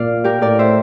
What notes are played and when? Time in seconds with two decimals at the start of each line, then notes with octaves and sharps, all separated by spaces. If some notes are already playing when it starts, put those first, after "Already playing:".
Already playing: A#2 D5 F5
0.24 G4 A#4
0.41 A2 A#4 D5
0.59 C5 E5